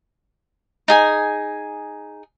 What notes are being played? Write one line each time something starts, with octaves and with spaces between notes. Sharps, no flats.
D#4 G#4 G#5